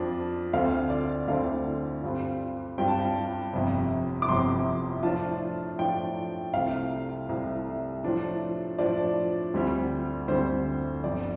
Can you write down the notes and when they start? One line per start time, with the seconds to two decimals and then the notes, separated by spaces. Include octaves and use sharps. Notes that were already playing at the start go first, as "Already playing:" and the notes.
Already playing: F2 F3 D4 F4
0.53 D2 D3 A3 C4 F5
0.90 D5
1.27 D2 D3 A3 C4 F5
2.03 G2 G3 C4 F4
2.78 G2 G3 C4 F4 G5
2.88 A5
2.99 G5
3.53 G1 F2 C3
4.22 D6
4.28 G1 F2 C3 C6
5.03 A2 F3 D4 F4 A5
5.78 A2 F3 D4 F4 G5
6.53 C2 C3 A3 F5
7.29 C2 C3 A3
8.04 A2 F3 D4
8.79 A2 F3 D4 D5
9.54 D2 D3 G3 C4
10.28 D2 D3 G3 C4 C5
11.04 G1 F2 D3 D5